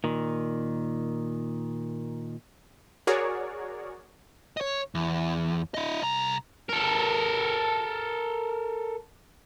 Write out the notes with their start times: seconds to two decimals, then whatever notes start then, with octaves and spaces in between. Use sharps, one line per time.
0.04 A#2 D#3
3.07 F#4 G#4 A#4 C#5 D5
4.57 C#5 D#5
4.95 E2
5.74 E4 D#5
6.02 C2 A#5
6.69 A4 A#4